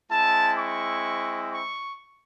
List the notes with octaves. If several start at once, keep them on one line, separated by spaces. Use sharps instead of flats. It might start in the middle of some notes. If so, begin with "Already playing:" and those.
G#3 C4 E4 A5
C#6
C#6